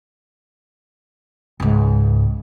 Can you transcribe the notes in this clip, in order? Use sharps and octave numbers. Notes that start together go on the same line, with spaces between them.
C#2 G#2